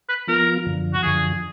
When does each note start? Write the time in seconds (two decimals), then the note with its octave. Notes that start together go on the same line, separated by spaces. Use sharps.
0.09 B4
0.27 F3 B3 F4 A#4
0.66 F#2 D3 F3
0.93 F#4
1.02 F#2 D3 F3 G#4